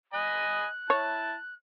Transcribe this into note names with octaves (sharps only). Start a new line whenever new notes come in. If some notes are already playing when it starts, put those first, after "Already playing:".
D#5 G#5 B5 F#6
E4 C#5 A5